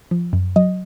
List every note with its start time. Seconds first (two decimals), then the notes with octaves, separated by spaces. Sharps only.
0.11 F3
0.33 F#2
0.56 F#3 D#5